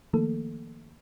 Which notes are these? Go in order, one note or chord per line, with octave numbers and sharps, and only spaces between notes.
D#3 F3 A3 A#3 A4